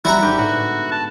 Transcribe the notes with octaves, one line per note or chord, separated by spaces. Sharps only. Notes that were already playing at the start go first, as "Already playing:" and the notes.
G#1 G3 E4 F#4 F#5 A#5
G#2 D3 A3 G4
A2 B3 F#4
A5